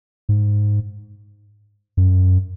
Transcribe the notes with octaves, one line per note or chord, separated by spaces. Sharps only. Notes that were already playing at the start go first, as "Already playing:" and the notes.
G#2
F#2